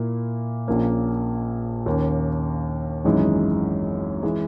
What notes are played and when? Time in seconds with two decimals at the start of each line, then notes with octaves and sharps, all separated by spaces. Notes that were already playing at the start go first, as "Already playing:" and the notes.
Already playing: A#2 A#3 E4
0.67 A#1 A#2 A#3 C#4
1.86 D#2 D#3 A#3 C#4
3.04 G#1 F#2 E3 G#3 D#4
4.23 E3 G#3